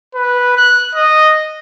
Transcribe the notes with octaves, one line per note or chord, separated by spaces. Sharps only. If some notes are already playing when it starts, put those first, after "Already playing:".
B4
F#6
D#5